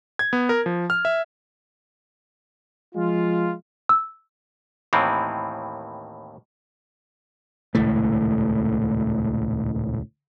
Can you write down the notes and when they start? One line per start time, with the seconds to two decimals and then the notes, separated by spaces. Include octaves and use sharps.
0.19 G#6
0.33 B3
0.49 A#4
0.66 F3
0.90 F6
1.05 E5
2.95 F3 G#3 F4
3.89 E6
4.93 D#2 A2 D#3 E3 C4
7.75 D#1 C#2 A2 A3